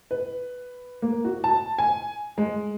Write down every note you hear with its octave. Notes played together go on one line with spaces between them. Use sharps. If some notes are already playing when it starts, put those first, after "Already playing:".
B4
A#3
F#4
A5
G#5
G#3